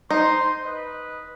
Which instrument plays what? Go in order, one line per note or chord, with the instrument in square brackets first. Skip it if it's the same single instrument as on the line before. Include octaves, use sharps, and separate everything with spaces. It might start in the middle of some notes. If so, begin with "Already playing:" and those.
[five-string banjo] D#4 [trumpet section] C5 C6
[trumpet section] B4 D#5